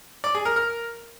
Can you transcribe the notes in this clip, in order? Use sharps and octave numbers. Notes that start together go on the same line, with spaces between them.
D5
G#4
A#4
A#4